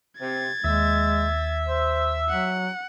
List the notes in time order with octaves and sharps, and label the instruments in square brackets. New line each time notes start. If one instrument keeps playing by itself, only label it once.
[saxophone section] C3 [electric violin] G#6 A6
[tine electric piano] D#2 [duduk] G#3 [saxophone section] E5
[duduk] C5
[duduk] F#3 [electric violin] F#5